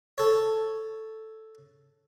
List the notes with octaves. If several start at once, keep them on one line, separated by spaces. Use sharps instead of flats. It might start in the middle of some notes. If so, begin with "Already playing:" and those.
A4 C#5